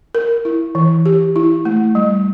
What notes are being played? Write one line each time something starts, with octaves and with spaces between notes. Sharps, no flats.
A#4
E4
E3
G4
E4
A3
G3